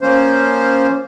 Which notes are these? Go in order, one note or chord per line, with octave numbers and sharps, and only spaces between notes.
F3 A#3 C#4 C5